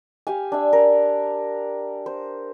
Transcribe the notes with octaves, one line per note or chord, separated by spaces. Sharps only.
G4 F5 G#5
D4 E5
A#4
C5